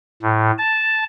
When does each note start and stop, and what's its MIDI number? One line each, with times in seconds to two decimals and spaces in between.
0.22 0.51 45
0.58 1.04 81